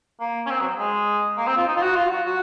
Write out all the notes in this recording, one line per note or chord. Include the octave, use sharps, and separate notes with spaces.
A#3
C#4
C4
F#3
G#3
A#3
C4
F4
D#4
F4
F#4
F4
F#4
F#4